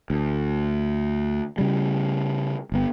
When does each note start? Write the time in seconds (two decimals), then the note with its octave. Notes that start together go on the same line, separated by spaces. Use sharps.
0.10 D2
1.58 C#3 G3
2.72 G1 B3